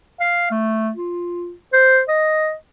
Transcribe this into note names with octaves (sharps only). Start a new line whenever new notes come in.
F5
A3
F4
C5
D#5